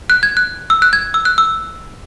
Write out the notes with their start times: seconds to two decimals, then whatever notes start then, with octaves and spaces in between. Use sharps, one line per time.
0.10 F#6
0.23 G#6
0.37 F#6
0.70 E6
0.82 F#6
0.93 G#6
1.14 E6
1.25 F#6
1.38 E6